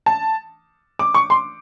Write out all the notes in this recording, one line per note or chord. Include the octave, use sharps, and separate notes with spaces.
A5
D6
C#6
C6